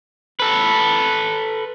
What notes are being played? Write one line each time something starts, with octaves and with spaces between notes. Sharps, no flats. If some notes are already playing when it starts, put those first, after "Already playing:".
A4 B4